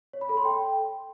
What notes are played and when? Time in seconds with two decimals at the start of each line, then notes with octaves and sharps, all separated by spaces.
0.13 C#5
0.21 B5
0.29 A4
0.37 C6
0.45 G5